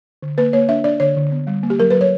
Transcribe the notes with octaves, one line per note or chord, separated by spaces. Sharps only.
D3
A#3 B4
A#3 C#5
D4 E5
D4 D5
D3 C#5
D3
B3
G3
A#3
G4
F#3 A#4
F#3 B4
C#5